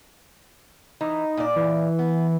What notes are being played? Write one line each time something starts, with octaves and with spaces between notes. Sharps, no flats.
E3 D#4
A#2 D5
E3
B3